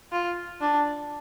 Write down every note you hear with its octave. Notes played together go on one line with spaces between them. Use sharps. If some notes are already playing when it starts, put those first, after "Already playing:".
F4
D4